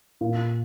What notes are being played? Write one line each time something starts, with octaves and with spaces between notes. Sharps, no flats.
A#2